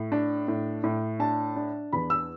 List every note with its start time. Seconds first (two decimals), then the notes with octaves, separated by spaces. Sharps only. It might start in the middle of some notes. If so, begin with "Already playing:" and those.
Already playing: A2
0.12 D4
0.48 A2
0.84 A2
1.19 D4 A5
1.56 D4
1.93 E2 B5
2.10 E6